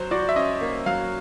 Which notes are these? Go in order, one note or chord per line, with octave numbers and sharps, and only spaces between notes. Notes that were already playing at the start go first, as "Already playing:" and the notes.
Already playing: F#3 C5
F#4 D5
E5
C#4 D#5
A#3
F#3 F5